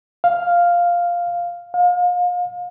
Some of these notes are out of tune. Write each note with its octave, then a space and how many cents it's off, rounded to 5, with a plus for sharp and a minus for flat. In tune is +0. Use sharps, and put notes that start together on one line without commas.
F5 +0
F5 +35